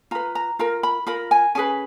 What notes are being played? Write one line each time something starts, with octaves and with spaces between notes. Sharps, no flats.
F4 B4 A#5
A#5
F4 A#4 A#5
B5
F4 A#4 B5
G#5
C#4 G#4 B4 G#5